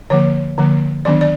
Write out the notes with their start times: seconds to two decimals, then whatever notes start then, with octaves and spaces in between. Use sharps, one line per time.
0.10 D3 F3 A#3 C#5
0.58 D3 F3 A#3
1.05 D#3 F#3 B3 D4 D5
1.21 D5